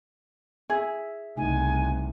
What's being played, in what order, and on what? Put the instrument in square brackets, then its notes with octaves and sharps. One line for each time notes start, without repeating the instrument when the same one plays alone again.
[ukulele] G#4 [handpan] E5
[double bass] C2 [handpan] C#3 A3 D#4 [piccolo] G#5